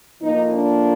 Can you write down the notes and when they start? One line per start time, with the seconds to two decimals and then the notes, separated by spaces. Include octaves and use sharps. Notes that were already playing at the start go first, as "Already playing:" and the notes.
0.21 A2 F3 A#3 D#4
0.52 D4